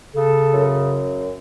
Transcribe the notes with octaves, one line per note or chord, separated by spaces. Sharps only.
C#3 A4
F#2